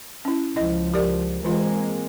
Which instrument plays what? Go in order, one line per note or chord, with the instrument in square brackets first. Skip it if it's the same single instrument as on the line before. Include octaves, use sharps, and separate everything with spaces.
[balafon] C#4 E4
[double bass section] C#2 F3 [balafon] E4 D#5
[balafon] G4 A#4 D5
[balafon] E3 F4 [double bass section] G#3 A#3 C4